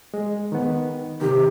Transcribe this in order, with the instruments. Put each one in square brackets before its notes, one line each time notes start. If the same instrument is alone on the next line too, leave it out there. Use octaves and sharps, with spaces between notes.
[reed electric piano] G#3
D#3 B3
[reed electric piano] C3 D#3 [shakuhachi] G4